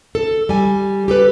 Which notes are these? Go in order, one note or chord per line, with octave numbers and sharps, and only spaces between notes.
A4
G3 G#5
G4 A4 B4